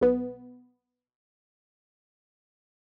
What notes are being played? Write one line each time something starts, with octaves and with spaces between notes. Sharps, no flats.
B1 B3